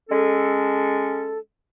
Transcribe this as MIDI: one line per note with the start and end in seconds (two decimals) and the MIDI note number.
0.10 1.38 56
0.10 1.38 61
0.10 1.38 69